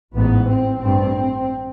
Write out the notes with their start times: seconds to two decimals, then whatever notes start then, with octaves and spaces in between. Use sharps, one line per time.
0.14 A1 G#2 B3
0.46 C4
0.78 A1 G2 C4